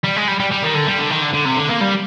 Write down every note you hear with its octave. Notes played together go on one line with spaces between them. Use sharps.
G3
G#3
G3
G3
G3
D#3
D3
G3
D3
D#3
D3
D3
C3
D3
A#3
G3